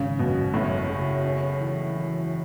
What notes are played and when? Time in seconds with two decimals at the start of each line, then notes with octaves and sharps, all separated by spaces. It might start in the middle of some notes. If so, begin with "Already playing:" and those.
Already playing: G#1 C#3
0.19 F#2 B2
0.54 F#2 A2
0.89 C#3
1.24 C#4
1.60 E3
1.96 E3